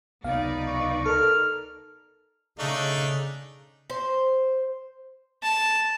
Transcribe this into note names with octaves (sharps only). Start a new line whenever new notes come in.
C#2 C3 B3 D#4 B4 D5 F5
C#6
A4 A#4 F6
C#3 A3 D4 D#4
C5
A5